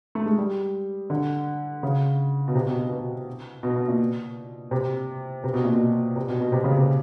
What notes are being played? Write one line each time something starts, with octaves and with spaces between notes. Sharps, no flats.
A3
G#3
G3
D3
C#3
B2
C3
B2
B2
B2
B2
B2
A#2
C3
C3
B2
A#2
B2
C3
B2
B2
C3
C#3
C3